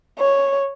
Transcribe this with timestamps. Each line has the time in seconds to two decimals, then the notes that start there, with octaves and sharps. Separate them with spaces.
0.19 C#5